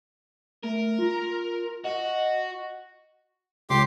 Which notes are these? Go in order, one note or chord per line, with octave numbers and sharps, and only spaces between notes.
A3 A#4
F4
F#4 D#5
C#2 G4 C6 D6